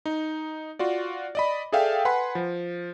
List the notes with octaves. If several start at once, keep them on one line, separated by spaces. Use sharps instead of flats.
D#4
F4 F#4 D5
D5 D#5 B5
G#4 A4 D5 E5 F5 G5
B4 F#5 G#5 B5 C6
F3